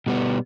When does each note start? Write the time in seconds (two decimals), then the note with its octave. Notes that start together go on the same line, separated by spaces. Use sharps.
0.06 B2 G3 B3